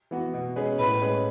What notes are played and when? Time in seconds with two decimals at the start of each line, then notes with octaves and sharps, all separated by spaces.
0.11 E3 B3 F#4
0.34 B2
0.56 G#3 C#4 G#4 B4
0.79 A2 B4
1.02 G#3 C#4 G#4 B4